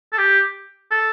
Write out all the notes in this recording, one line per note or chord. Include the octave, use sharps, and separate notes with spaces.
A4
G4
A4